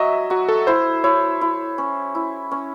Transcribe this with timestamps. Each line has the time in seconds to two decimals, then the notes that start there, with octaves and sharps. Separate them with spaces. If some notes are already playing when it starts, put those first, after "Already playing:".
Already playing: F#3 D#5 E5
0.30 F#3 F#4
0.48 A4
0.67 E4 C5
1.04 E4 C#5
1.41 E4
1.78 C#4
2.15 E4
2.51 C#4